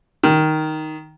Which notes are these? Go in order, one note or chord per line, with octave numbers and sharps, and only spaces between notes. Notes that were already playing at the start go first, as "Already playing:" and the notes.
D#3